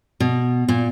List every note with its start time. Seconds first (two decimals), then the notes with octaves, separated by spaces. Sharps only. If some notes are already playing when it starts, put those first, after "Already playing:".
0.20 B2
0.69 A#2